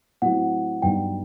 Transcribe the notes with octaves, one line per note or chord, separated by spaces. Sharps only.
A2 F#3 C4 F#4 F#5
G2 F#3 B3 D#4 G5